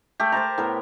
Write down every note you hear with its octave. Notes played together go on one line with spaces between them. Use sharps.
A3 G4
A#4 C5 A5 A#5
A2 B3 A#4